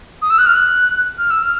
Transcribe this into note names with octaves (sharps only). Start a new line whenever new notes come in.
D#6
E6
F#6
F6
F#6
F6
E6
F6